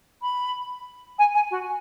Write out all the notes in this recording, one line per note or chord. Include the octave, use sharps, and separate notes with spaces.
B5
G#5
G#5
F#4